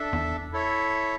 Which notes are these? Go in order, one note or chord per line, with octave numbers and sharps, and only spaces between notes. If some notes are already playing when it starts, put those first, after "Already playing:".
Already playing: D4 A4 E5
E2
E4 A4 C#5 E5